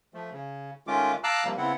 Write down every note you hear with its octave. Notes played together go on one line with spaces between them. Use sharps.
F3 A3
C#3
D#3 G#3 A3 C#4 F4 D6
F5 A5 A#5 D6 E6 F#6
C3 F3 G3 A#3
C#3 B3 C4 E4 F#5